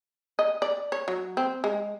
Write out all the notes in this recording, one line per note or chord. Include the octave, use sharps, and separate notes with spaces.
D#5
D5
C#5
F#3
C4
G#3